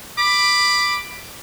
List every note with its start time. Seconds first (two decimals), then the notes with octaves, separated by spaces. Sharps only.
0.17 B5 D6